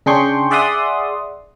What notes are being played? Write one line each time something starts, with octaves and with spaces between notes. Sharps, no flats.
C#3 D4 G#4 G5 C6 C#6
G#4 D5 E5 F#5 C6 D#6